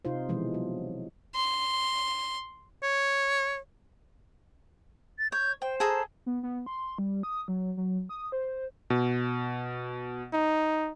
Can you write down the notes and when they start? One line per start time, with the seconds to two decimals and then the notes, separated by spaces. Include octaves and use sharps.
0.05 C3 D#4 F4 C5
0.29 B2 E3 F3 G#3
0.54 F#3
1.35 C6
2.83 C#5
5.19 A6
5.32 C#5 G6
5.62 C5 G5
5.80 G#4 A4 A#5
6.26 B3
6.43 B3
6.66 C6
6.98 G3
7.23 D#6
7.48 F#3
7.77 F#3
8.09 D#6
8.32 C5
8.90 B2
10.33 D#4